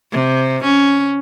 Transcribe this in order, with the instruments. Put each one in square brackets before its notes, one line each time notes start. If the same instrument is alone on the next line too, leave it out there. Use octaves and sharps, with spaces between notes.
[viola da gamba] C3
C#4